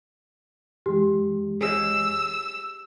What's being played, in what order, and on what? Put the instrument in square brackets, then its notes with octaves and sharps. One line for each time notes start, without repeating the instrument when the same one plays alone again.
[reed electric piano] F#2 E3 G#3 [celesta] G4
[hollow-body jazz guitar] G#4 C#5 D#5 [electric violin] E6